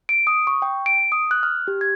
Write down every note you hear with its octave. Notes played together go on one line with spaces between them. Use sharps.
D7
D#6
C#6
G5
D7
D#6
F#6
F6
G4
G#6